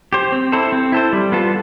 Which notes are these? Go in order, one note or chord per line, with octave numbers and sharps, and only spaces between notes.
G4 C5
C4
E4 A4 C5
C4
E4 A4 C5
G3
B3 F4 A4